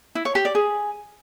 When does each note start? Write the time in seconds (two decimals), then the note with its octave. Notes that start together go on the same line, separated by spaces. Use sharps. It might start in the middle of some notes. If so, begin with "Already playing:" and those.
0.15 E4
0.25 C#5
0.35 G4
0.45 D5
0.55 G#4